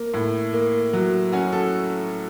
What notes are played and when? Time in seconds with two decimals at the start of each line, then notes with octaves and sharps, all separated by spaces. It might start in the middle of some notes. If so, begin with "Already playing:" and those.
Already playing: A#3
0.14 A2
0.53 A#3
0.93 F#3
1.32 C#4 F#4
1.52 A4